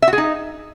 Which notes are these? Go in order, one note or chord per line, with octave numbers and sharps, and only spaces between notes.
E5
F#4
G#4
D#4